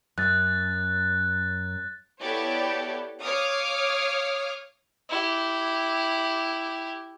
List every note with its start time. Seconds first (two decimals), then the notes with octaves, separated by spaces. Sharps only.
0.18 F#2 F#6 A6
2.20 B3 E4 G4 A4 C#5 D5
3.21 C#5 F5 D6 D#6 F6
5.10 E4 G4